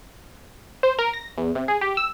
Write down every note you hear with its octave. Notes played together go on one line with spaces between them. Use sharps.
C5
A#4
A#6
E2
C3
G#4
G4
E6